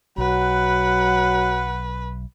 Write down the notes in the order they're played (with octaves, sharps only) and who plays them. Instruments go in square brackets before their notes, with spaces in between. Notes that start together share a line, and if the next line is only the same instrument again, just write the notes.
[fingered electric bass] B1 [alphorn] F#3 [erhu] B4 [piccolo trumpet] F#5